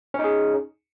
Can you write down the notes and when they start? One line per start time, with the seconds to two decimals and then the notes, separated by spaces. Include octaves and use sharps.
0.14 C#4
0.19 D#4
0.24 G#4